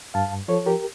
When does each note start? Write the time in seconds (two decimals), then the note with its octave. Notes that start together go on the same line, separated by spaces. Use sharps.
0.14 G2 F5 A5
0.48 F3 A4 C#5
0.66 G4 A#4